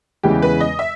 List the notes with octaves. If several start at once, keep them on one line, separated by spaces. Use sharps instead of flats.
E2 C#3 E3 G#3 G4
B4
D#5
E5